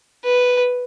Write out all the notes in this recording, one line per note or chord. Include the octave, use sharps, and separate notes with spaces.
B4